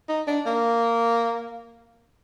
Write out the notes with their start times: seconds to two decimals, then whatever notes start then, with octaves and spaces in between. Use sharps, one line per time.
0.09 D#4
0.27 D4
0.46 A#3